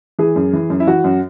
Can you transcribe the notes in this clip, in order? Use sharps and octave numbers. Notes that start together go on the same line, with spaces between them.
E3 G#4
F#2
E3
F#2
E4
E3 F#4
F#2